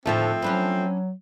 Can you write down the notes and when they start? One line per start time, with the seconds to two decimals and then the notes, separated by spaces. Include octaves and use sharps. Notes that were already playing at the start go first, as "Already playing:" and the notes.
0.06 D#2 A2 D3 F3 A3 C4
0.42 F#3 C#4 D4 B4